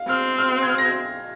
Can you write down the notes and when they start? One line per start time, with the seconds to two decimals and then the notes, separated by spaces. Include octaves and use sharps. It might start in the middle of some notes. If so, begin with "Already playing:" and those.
Already playing: F5
0.08 C4 F6
0.38 F6
0.62 G#6
0.70 F6
0.78 A#6
0.85 G#6